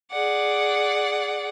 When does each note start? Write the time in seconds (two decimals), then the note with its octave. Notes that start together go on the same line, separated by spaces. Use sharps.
0.11 G#4 D5 F#5